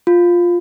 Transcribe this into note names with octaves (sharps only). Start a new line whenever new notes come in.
F4